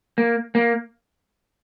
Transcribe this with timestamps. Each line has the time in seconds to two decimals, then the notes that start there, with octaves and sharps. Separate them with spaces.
0.18 A#3
0.55 A#3